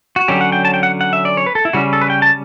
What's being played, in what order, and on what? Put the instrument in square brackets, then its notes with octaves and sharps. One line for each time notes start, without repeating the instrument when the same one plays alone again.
[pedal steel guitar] F#4
D3 F#3 C#4 G4
F#5
G5
A5
G5
F#5
F#5
E5
D5
C#5
B4
A4
E4
C#3 G3 C#4 F#4
A4
B4
G5
A5